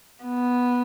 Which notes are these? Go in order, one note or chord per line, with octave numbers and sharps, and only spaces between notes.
B3